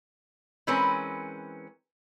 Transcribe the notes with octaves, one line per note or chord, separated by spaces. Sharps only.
E3 G#3 C4 C#4 A#4 B4